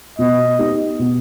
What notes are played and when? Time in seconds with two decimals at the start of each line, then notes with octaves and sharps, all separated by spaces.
0.19 B2 D#5
0.59 B3 D#4 G4
0.99 B2